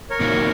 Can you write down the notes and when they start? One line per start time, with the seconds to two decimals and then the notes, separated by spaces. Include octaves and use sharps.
0.10 A#4 C#5
0.20 A#2 F#3 A#3 D#4